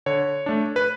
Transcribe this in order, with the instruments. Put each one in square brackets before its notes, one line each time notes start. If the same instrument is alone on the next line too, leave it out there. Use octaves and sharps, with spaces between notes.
[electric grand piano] D3 C#5
A3 D4
B4